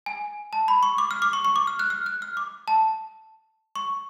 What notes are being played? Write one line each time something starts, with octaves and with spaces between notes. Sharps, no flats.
G#5
A5
B5
C#6
D6
F6
D6
C#6
C#6
D6
F6
F#6
F6
F#6
F6
D6
A5
C#6